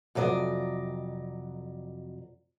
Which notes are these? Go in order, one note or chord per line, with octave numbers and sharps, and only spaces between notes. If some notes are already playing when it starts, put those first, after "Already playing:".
F2 C3 F#3 D5 D#5